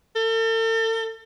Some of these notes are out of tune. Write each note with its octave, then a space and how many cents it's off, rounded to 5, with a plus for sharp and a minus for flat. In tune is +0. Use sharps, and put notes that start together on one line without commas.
A4 +40